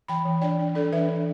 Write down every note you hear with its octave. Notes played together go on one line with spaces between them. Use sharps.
E3 G5 B5
E3
D4 D5 G5
D4
D4 A4 D5
E3 B4 E5
D4